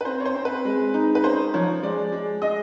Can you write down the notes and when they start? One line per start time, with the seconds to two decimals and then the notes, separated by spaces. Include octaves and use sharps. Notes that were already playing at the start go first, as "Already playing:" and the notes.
0.01 B4
0.05 C4 C5
0.20 C#5
0.25 C5
0.35 C4
0.45 B4
0.65 G#3
0.94 D#4
1.15 B4
1.24 C#4 C5
1.54 F3 C#5
1.83 G#3 D5
2.12 G#3
2.42 G#3 D#5